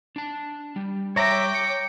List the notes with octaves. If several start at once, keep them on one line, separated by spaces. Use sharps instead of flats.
D4 A5
G3
C#5 E5 G5 A#5 D6
C#7